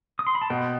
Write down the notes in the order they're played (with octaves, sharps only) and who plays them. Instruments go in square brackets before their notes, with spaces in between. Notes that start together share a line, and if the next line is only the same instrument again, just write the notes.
[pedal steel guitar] D#6
C6
B5
A5
[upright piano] B2 [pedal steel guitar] G5